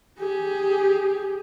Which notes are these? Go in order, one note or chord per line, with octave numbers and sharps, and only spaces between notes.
G4 G#4